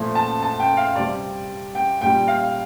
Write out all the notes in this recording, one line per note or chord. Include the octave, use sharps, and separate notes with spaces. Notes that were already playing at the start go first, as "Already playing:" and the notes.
Already playing: A#2 F3 A3
A5
A5
G5
F5
C3 G3 D5
G5
A#2 G3 G5
F5